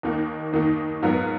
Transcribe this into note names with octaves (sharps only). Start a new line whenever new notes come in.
D#2 D#3 A#3 D#4
D#2 D#3 A#3 D#4
G#2 F#3 B3 F4 A#4